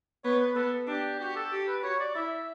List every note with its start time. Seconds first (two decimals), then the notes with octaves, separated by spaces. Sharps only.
0.24 B3 C#5
0.39 B4
0.55 B3 A4
0.87 D4 G4
1.20 F#4 G4
1.36 A4
1.52 G4
1.67 B4
1.83 F#4 C#5
2.00 D5
2.15 E4 E5